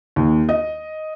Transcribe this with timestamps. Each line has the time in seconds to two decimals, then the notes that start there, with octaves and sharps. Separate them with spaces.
0.16 D#2
0.49 D#5